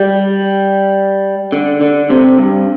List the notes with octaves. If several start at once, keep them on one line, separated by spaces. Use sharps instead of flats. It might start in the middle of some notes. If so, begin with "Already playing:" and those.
Already playing: G3
D3
D3
C3
G2